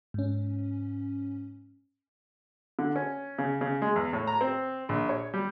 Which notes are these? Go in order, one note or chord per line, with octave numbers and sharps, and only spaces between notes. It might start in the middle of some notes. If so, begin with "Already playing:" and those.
G#2 C#4
D3
C#4
C#3
C#3
G#3
E2
A2
A#5
C4
A#1
C#5
G3